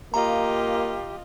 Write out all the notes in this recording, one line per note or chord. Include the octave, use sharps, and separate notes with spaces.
A#3 F4 G4 D#5 A#5